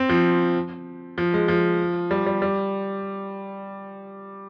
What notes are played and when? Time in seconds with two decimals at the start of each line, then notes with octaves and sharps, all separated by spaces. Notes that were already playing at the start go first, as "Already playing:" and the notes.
Already playing: C4
0.09 F3
1.18 F3
1.34 G#3
1.48 F3
2.11 G3
2.26 G3
2.42 G3